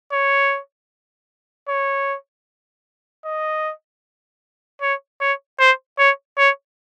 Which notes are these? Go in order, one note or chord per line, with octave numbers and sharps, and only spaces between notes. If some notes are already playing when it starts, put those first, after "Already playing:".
C#5
C#5
D#5
C#5
C#5
C5
C#5
C#5